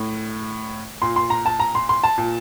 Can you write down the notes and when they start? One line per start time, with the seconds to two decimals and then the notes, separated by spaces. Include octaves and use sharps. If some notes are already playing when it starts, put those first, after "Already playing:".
Already playing: A2
1.02 A#2 C6
1.16 C6
1.30 A#5
1.46 A5
1.60 A#5
1.75 C6
1.89 C6
2.04 A5
2.18 A#2